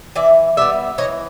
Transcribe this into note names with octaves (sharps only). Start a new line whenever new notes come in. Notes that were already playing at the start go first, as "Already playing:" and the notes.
E3 D5 E5
G3 B3 D5 E5
E3 C#5 D#5